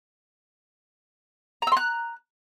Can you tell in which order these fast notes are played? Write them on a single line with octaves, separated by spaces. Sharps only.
A#5 E6 C6 F#6